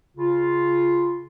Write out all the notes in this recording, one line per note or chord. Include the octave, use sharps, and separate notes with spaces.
C#3 F4